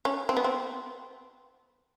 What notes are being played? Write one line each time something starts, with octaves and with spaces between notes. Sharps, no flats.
C#4
C4
B3
C4